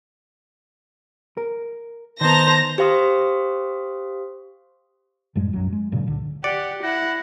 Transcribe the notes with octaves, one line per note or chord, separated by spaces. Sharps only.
A#4
D#3 B3 C5 A5 A#5 A#6
G4 C5 F5 C6 D#6
F#2 A2 G3 G#3
B1 F#2 F#3
G#3
G2 A#2 C#3 F#3
C#2 D3
G4 D5 F#5 C#7
E4 F#5 A#6